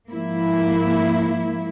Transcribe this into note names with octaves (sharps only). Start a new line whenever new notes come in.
G#2 F3 A#3 E4